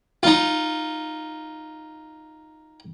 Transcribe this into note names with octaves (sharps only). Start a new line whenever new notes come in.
D#4 F4